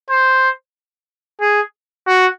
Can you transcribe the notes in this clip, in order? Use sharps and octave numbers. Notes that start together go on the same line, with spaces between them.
C5
G#4
F#4